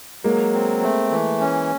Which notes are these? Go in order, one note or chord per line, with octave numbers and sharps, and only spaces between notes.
F#3 G#3 A#3
C4
A3
E3
C#4